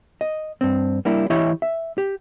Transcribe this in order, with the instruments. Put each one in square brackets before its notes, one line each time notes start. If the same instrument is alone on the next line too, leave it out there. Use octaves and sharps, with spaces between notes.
[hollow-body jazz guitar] D#5
G2 C4
G3 A#3 D4 E4
E3 E4 G4 C#5 D#5 E5
E5
G4